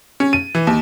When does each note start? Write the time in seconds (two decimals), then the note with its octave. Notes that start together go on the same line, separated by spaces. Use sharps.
0.20 C#4
0.33 D#7
0.55 E3
0.67 D#2